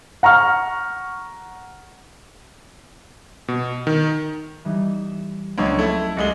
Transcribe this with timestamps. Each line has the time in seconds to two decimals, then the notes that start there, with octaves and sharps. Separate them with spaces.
0.23 F#5 A#5 C#6 F6
3.48 B2
3.87 D#3
4.65 E3 G3 D#4
4.93 E7
5.58 C#2 F3 F#3 C#4 D4 C#5
5.78 A3 E4
6.16 C2 G#3 A6 A#6 C#7 G7